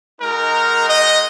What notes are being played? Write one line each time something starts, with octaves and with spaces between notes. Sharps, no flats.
G#3 D#4 F#4 A#4
D#5